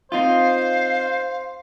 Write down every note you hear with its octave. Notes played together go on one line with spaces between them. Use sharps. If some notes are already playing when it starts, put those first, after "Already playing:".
C4 D#4 F4 C5 F5